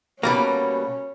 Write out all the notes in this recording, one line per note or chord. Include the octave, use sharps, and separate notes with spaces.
B2 G3 A#3 C#4